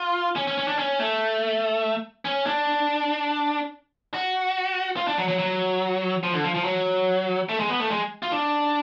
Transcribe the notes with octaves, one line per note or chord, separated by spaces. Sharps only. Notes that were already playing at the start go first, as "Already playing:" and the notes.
Already playing: F4
C#4
C#4
C#4
D4
C#4
A3
C#4
D4
F#4
F4
D4
F#3
F#3
F#3
F3
D3
F3
F3
F#3
A3
G#3
B3
A3
G#3
F4
D4